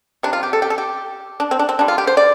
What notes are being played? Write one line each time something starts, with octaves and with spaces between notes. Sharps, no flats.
C3 G3 D4
F4
G4
A4
G4
A4
G4
D4
C4
D4
C4
D3 G3 D4
F4
G4
C5
D5